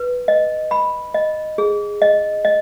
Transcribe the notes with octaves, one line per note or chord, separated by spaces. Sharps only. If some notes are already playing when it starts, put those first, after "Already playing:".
Already playing: B4
D#5
B5
D#5
G#4
D#5
D#5